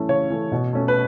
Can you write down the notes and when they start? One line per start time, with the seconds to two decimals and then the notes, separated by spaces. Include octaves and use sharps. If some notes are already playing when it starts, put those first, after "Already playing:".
Already playing: E3 A3 C#4
0.09 C#3 C#5
0.30 E3 A3 C#4
0.52 B2
0.73 A3 C#4
0.88 B4